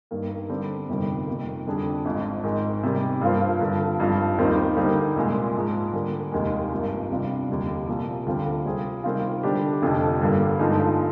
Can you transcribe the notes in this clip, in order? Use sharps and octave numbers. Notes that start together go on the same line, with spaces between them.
G2 D#3 A#3
D3 G3 C4
G1 F2 C3 D#3 G3
F2 C3 D#3 A#3
F2 D3 G3 D4 G#4
G#1 G#2 F3
G#2 D#3 G#3
C3 D#3 G3
G2 F3 A#3 F4 C5
G2 D3 F3
G#1 G2 F3
D#2 D#3 G3 C4 D#4
D3 G3 A#3 D#4
C2 A#2 G#3
G#2 F3 G#3
D3 G3 A#3
F1 D#2 D#3 G#3
G#1 G2 F3 A#3
C2 C3 G3 D4 F4
F1 D#2 D3 G3
C2 A#2 F3
D2 D3 G3 C4 F4
C3 G3 C4 F4 G#4
C3 D#3 G3 C4 F4
D3 G3 D4 G4
F1 F2 D3 F3
G2 D3 G3 A#3
G2 D3 F3 G#3 D#4